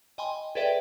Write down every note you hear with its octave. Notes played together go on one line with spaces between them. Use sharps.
D#5 G5 G#5 B5 C6
G#4 A4 B4 D5 E5 G5